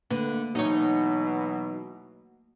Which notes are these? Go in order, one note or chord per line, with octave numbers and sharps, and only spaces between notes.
D3 A3 A#3 B4
B2 E3 F#3 D#4 C#5